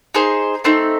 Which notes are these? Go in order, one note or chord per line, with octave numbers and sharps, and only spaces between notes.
D#4 G#4 C5
A3 C4 D#4